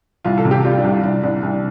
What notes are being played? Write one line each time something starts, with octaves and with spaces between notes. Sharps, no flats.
C2 F4
A4
C3
G4
G3 F4
D4
C2
F4
C2 D4
C2 D4
C2